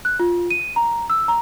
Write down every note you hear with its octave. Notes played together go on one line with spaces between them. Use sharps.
F#6
F4
D#7
A#5
E6
A#5